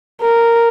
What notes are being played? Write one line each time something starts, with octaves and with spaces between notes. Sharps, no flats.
A#4